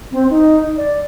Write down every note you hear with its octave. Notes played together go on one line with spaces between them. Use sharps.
C4
D#4
D5